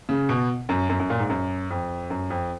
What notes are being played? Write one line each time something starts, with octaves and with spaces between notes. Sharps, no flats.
C#3
B2
F#2
F#2
F#2
A#2
G#2
F#2
F2
F#2
F2